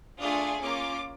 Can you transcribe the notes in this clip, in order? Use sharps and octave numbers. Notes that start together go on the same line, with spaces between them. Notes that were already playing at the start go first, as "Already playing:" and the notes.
A3 D4 F4 G#4 D#6
A#3 C#4 F4 D6